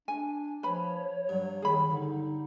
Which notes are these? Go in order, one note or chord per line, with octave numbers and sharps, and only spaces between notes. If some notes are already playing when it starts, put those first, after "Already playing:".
D4 G#5
F3 B4 C#5 B5
G2 F#3
D#3 G#4 B5
D3 D#4